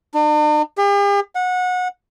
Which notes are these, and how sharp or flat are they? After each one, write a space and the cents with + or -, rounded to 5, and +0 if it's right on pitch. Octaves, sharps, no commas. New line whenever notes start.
D4 +45
G4 +45
F#5 -25